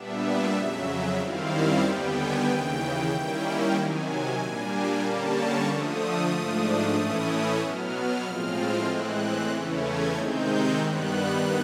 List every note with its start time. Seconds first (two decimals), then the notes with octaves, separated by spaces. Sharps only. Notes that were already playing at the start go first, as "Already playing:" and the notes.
Already playing: A#2 G3 B3 D4 E5
0.55 F2 C#3 F#3
1.19 F#2 D#3 G3 C4 E4 F5
1.82 D#2 D3 G3 B3 G5
2.14 G#5
2.46 D#2 C#3 E3 G5
3.11 D#3 G3 A#3 C#4 E4
3.74 C3 D#3 F#3 G#5
4.39 A#2 G3 A#3 D4
5.02 D3 G3 A#3 C#4 A5
5.35 C#6
5.66 D3 F3 A3 D#6
6.31 G#2 F3 A3 D4
6.94 A2 E3 A3 C#4 E4
7.59 B2 F#3 B3 F6
8.22 A2 F3 G#3 C4 F4
8.86 A2 E3 G#3 C4 F#6
9.51 E2 C#3 E3 A3 C#4
9.83 G#6
10.15 C3 D#3 G#3 C4 D#4 G6
10.79 G2 D#3 G3 B3 F#6